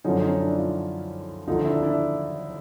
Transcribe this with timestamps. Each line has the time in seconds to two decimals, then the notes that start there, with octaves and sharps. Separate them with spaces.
0.04 F#2 D3 F3 C#4 D#4
0.22 C#4 D#4
0.40 D4 E4
0.58 D#4 F4
1.47 D#2 D3 F3 D#4 F4
1.65 D4 E4
1.83 D4 E4